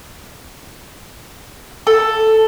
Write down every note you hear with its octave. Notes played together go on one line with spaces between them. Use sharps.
A4